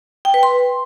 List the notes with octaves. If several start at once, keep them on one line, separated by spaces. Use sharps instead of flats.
G5
B4
C6